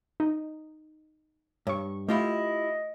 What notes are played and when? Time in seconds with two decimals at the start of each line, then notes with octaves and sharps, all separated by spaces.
0.20 D#4
1.67 G2 C#5 C#6
2.08 A3 E4 F4 G4 D#5